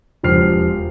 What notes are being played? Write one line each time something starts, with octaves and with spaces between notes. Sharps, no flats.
E1 F3 G4 C5 F6 C7